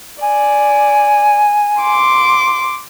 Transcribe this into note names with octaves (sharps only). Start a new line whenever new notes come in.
D5 G#5
C6 D6